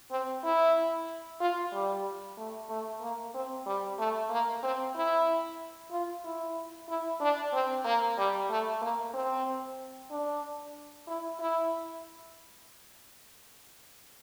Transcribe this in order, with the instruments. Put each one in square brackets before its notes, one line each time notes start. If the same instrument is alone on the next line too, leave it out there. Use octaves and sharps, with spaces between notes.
[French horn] C4
E4
F4
G3
A3
A3
A#3
C4
G3
A3
A#3
C4
E4
F4
E4
E4
D4
C4
A#3
G3
A3
A#3
C4
D4
E4
E4